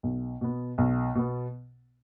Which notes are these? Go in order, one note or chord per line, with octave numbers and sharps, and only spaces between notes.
B1
B2 B3
B1
B2 B3